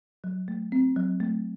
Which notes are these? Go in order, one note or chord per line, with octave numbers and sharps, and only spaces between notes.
F#3
A3
C4
F#3
A3